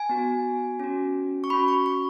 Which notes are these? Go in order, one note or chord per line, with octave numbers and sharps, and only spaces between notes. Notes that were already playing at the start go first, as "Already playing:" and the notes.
Already playing: G#5
B3 F#4
C#4 F#4
C#6
C#4 F#4 B5
C#6
C#6